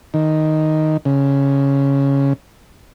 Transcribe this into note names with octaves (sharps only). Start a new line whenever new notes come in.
D#3
C#3